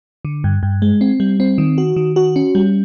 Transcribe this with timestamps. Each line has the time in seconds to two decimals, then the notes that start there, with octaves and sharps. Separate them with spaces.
0.25 D3
0.44 G2
0.63 G2
0.82 G#3
1.01 C4
1.20 G3
1.40 C4
1.58 D#3
1.78 F#4
1.96 D#3
2.16 F#4
2.36 C#4
2.55 G3